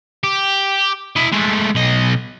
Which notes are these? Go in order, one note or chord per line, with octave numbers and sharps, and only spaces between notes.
G4
E4 D#5
G#3 A3
B1 D#5